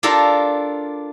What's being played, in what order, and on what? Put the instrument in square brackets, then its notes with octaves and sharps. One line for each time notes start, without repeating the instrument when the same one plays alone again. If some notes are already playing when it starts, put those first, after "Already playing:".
[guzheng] D4 F4 G4 A4 A#4